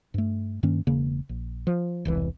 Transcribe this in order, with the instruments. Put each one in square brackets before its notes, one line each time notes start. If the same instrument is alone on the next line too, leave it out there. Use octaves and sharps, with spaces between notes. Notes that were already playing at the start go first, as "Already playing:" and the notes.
[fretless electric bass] G2 A3
G2 D#3 A#3 C#4
E1 C#3 A#3
A#1
F3
E1 C2 E3